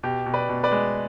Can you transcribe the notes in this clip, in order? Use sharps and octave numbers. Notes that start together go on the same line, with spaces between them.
B2 G4
B2
B4 D5
B2
B4 D5
G#3